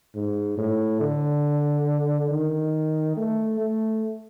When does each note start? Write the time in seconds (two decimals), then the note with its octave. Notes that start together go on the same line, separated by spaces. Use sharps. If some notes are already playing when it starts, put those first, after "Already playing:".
0.15 G#2
0.58 A2
1.01 D3
2.31 D#3
3.17 A3
3.60 A3